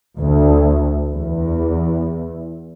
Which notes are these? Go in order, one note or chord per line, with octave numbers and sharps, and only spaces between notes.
D2
E2